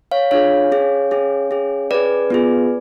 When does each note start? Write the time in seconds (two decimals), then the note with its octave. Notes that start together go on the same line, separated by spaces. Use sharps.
0.11 C#5 F5
0.31 D4 F4 G#4 C#5 F5
0.72 C#4 G#4
1.11 C#4 G#4
1.51 C#4 G#4
1.91 C#4 G#4 B4 D5
2.30 B3 F4 G#4